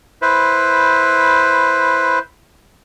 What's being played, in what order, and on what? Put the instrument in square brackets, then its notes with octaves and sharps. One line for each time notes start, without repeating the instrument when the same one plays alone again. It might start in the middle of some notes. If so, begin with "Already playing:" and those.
[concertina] E4 B4 C5